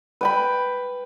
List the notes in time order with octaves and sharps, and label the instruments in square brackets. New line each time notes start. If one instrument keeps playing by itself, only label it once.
[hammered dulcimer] B4 G5 B5